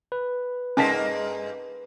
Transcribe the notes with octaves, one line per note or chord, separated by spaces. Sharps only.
B4
G2 G#3 A#3 C#4 A5 B6